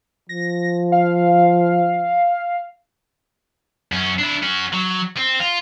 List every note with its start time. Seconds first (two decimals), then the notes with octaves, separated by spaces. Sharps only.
0.29 F3 A#6
0.92 F5
3.92 F#2 C#4
4.19 D4 E4
4.43 C#4 F#4
4.73 F#3
5.17 C4
5.40 F4